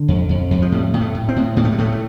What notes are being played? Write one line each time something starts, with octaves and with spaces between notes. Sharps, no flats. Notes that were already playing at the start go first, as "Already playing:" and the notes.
Already playing: D3
F2
F2
F2
F3
A2 G3
A2
A3
A2
C4
A2
A2 A#3
A3
G3
A2 A3
A3